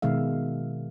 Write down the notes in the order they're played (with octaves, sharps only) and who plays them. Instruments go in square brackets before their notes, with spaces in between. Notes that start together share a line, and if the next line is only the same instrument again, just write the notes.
[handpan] B2 D#3 G#3 E5 F5